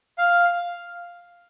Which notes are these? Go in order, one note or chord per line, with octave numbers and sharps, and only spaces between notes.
F5